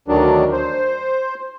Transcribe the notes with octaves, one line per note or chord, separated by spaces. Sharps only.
D2 D#3 F#3 D4
C5